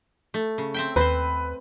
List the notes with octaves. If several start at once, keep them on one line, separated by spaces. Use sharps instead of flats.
A3
C#3
C4 E5 G5
D#2 C4 B4 C5